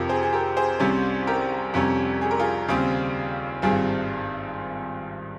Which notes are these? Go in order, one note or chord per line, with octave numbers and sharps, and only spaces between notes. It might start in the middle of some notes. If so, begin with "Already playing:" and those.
Already playing: F2 C3 F3 G4 A#4
G#4 C5
G#4
G4 A#4
G#4 C5
C2 C3 G3 C#4
G4 A#4
F2 C3 G3 C#4
G#4
A#4
F4 G#4
D#2 C#3 G3 C4
G#1 G2 G3 C4 F4 G#4